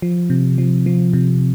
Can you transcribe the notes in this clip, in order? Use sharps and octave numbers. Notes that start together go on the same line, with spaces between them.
F3
C3
F3
F3
C3